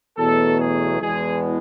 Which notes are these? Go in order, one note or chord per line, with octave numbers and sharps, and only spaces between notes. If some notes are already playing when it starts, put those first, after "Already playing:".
E2 B2 F#3 A3 A4
G#4
E2 B2 G#3 G#4